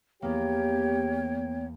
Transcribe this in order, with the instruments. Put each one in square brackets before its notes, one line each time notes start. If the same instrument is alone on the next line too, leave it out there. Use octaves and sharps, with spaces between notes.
[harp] E2 A#3 [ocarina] B3 [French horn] G4 [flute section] C#5 G5